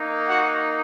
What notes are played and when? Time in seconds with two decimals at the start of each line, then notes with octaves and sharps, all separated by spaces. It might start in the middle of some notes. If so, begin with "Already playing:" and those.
Already playing: A#3 D#4
0.28 F#4 F#5